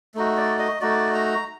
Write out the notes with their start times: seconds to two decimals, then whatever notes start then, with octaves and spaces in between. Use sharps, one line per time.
0.15 A3 D#4 F#4
0.37 D5
0.59 D#5
0.81 A3 D#4 F#4 D5
1.14 A#5